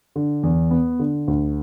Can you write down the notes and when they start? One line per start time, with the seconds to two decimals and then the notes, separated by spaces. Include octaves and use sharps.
0.16 D3
0.43 E2
0.71 B3
0.99 D3
1.28 D2